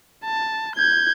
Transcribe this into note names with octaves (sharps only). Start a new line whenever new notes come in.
A5
G6 G#6